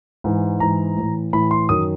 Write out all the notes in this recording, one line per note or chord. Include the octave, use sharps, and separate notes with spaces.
G#2 E3
G#2 E3 A#5
A2 E3
A2 E3 B5
C6
F#2 D#3 D#6